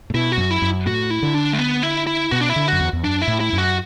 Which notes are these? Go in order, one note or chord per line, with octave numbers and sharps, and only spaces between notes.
A2
B2 E4
F#4
F#2
E4
F#2
A2 F#4
E4
D3
D4
A3
B3
E4
E4
B2 F#4
D4
E4
D3
F#2 F#4
E2
E2
F#2 D4
E4
A2
E4
F#2
F#4